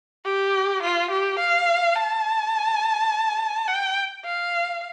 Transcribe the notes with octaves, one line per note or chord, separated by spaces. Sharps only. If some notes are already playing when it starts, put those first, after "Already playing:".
G4
F4
G4
F5
A5
G5
F5